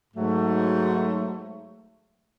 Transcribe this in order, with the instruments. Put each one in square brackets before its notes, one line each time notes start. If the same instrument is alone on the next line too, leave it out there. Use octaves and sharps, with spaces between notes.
[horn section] G#2 F#3 A3